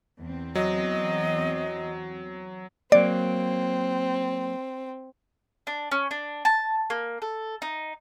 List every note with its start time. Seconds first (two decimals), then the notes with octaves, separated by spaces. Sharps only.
0.19 E2 C4
0.55 F#3 D#5
2.92 F#3 A#3 C4 D5
5.67 D4
5.92 C#4
6.11 D4
6.45 A5
6.90 A#3
7.22 A4
7.62 D#4